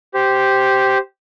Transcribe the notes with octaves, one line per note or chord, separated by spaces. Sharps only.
G4 C5